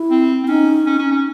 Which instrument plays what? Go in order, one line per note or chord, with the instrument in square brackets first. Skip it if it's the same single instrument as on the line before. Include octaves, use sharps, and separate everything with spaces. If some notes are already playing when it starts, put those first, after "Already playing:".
Already playing: [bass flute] E4
[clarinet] C4
C4
[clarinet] C#4 [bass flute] D#4
[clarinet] C#4
C#4
C#4